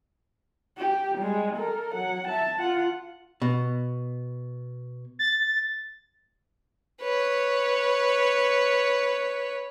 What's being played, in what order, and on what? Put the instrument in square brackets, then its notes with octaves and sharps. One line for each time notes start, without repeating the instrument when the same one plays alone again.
[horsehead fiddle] G4
G3 G#3
A4 A#4
F#3 F#5
E5 A5
F4 F#5
[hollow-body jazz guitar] B2
[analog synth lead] A6
[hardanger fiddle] B4 C#5